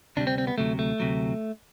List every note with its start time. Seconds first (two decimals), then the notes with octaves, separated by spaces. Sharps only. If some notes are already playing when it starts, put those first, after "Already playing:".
0.17 D2 C3 G3 D4
0.27 C4
0.38 C4
0.47 B3
0.58 D2 C3 F#3 A3
0.79 A3
1.00 D2 C3 F#3